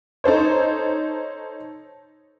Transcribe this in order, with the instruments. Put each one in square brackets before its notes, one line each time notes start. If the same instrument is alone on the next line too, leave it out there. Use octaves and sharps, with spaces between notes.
[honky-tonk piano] D#4 A4 C5 C#5